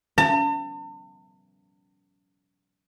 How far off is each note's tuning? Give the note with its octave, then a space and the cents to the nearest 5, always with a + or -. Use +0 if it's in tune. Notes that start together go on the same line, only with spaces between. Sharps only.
A5 +45